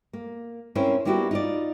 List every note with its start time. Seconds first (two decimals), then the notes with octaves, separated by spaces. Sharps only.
0.13 A#3
0.75 C4 C#4 E4 A#4 C5
1.05 G3 A#3 B3 E4 F#4 G4
1.31 D#4 F4 D5